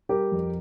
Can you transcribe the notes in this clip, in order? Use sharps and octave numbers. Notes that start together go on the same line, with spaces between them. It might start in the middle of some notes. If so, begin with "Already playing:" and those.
G3 G4 A#4
F2